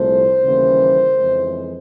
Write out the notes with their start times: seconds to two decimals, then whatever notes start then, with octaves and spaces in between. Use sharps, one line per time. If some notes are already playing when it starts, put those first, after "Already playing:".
Already playing: C2 A#2 F3 A3 C5
0.41 D#2 C#3 E3 G3 A#3
1.16 F2 C#3 E3 G#3